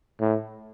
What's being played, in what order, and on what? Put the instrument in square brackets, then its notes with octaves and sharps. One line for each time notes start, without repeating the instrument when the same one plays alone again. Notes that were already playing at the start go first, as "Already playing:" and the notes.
[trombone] A2